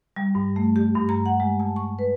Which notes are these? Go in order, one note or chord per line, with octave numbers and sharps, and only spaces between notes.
G3
G2
A3
G4
G2
A#5
F#5
G#3
A5
C#6
B4